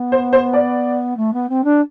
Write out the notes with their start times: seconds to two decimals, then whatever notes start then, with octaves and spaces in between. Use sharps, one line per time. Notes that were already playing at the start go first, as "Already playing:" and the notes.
Already playing: B3
0.12 C5
0.33 C5
0.53 D5
1.17 A3
1.33 B3
1.49 C4
1.64 D4